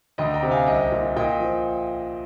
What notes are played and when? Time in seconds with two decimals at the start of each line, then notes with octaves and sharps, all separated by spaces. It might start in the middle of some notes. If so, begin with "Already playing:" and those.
0.18 D2 D#5 G5
0.34 G5 A#5
0.43 C3
0.51 F5 G#5
0.66 C2 D#5 G5
0.92 A#2
1.16 A#2 D#5 G5
1.40 F3